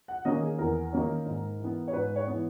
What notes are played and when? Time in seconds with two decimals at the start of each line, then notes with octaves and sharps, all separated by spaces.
0.08 F#5
0.25 D#3 A#3 C#4 D#5
0.42 G#4
0.59 E2 A#4
0.92 D#3 A#3 C#4
1.26 G#2
1.60 E3 B3
1.88 C#5
1.93 G#2 B4
2.16 C#5
2.27 E3 B3